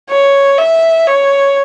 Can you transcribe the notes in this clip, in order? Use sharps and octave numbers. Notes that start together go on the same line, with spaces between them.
C#5
E5
C#5